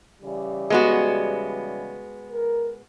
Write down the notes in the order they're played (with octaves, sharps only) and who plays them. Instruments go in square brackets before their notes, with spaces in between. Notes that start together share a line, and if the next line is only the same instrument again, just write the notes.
[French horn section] C#3 E3 G3
[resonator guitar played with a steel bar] G#3 B3 F#4
[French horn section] A#4